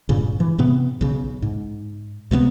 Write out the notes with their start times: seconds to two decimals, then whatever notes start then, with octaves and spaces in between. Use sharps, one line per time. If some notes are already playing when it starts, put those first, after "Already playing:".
0.09 G2 A#2 C#3
0.40 E3
0.58 G#2 C3 B3
1.01 B1 C#3
1.42 G#2
2.31 C#2 C3 A3 B3